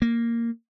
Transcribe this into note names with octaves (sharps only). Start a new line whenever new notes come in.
A#3